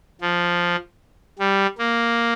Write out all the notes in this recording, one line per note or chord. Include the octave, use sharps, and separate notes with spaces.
F3
G3
A#3